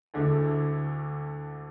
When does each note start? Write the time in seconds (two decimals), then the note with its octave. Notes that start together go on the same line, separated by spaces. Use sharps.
0.14 D2 D3 A3 E4